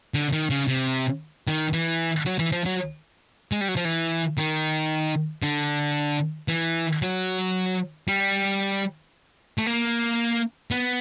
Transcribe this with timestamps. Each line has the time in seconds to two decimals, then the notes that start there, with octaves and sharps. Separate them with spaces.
0.14 D3
0.33 D#3
0.50 C#3
0.68 C3
1.48 D#3
1.73 E3
2.26 F#3
2.39 E3
2.52 F3
2.65 F#3
3.52 G#3
3.61 G3
3.68 F#3
3.76 F3
3.85 E3
4.38 D#3
5.43 D3
6.48 E3
7.02 F#3
8.08 G3
9.58 A3
9.66 A#3
10.71 B3